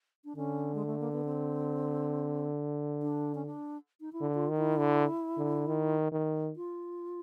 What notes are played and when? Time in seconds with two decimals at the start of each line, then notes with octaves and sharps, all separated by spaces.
0.25 D4
0.36 D3 C#4
0.75 G#3
0.86 A3
0.99 A#3
1.12 B3
1.25 C4
3.02 D4
3.35 C#4
3.46 D4
4.01 D#4
4.13 E4
4.20 D3
4.34 F4
4.49 D#3
4.57 E4
4.79 D3
5.38 D3
5.67 D#3
6.12 D#3
6.56 F4